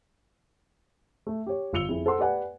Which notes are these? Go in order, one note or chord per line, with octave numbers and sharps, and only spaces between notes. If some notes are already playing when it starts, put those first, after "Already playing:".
A3
G4 C#5
G1 F4 E6 C#7 F7 G7
F2 E4 G#4
A4 C5 F#5 C6 E6
G4 B4 D5 F#5 G#5